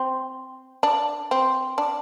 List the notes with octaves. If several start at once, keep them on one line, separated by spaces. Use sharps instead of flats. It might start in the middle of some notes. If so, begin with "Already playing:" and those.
Already playing: C4
D4
C4
D4